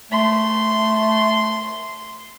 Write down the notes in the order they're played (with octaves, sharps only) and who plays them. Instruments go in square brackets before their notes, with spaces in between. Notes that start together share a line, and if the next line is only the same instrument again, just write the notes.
[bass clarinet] A3 [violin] C6